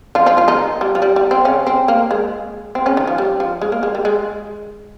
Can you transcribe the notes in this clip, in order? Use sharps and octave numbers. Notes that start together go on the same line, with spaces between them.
F3 F4
F3 F4
F3 F4
D#3 D#4
G3
F3
G3
G3
C4
C#3 C#4
C4
A#3
G#3
C4
C#3 C#4
D#3
F3
G3
F3
G#3
A#3
G#3
G3
G#3